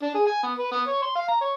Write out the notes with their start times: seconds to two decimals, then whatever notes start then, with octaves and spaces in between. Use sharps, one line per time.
0.02 D4
0.14 G#4
0.26 G#5
0.43 B3
0.58 B4
0.72 B3
0.87 C#5
1.02 C6
1.15 F5
1.28 A#5
1.41 C#5